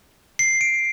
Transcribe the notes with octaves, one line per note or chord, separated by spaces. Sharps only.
C7
D7